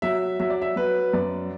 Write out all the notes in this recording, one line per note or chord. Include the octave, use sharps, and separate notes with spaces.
F#3 E5
F#3 E5
D5
E5
F#3 B4
F#2 D5